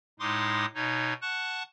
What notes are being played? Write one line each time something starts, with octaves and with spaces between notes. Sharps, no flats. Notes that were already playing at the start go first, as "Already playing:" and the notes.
A2 G#3 D#4 C6 D6 D#6
B2 D#4 C#5
F#5 A5 C#6 F#6